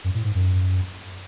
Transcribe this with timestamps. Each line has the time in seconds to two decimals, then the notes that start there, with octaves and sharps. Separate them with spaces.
0.04 F#2
0.14 A2
0.25 G#2
0.35 F#2